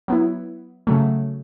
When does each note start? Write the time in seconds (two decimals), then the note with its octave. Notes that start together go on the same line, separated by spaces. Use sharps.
0.08 F#3 B3 E4
0.87 C#3 F#3 A3